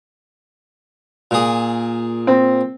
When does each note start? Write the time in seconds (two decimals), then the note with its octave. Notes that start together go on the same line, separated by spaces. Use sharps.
1.31 A#2 G#4
2.27 C4